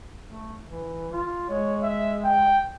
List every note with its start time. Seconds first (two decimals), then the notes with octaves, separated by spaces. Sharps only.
0.24 A3
0.66 E3
1.12 F4
1.49 G#3 C#5
1.83 E5
2.24 G5